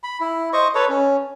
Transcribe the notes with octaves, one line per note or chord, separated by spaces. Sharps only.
B5
E4
C5 D#5 C#6
A4 B4 C#5
C#4